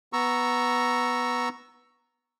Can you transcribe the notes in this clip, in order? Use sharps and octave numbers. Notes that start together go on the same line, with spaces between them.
B3 A#5 C#6 E6